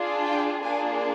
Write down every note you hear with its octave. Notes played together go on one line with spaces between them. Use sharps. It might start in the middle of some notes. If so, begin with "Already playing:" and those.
Already playing: D4 F4 G#4
G5
A#3 D4 F4 G#4 G#5